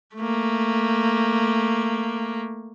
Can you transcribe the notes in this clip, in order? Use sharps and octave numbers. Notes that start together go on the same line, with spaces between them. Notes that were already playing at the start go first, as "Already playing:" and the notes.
A3 A#3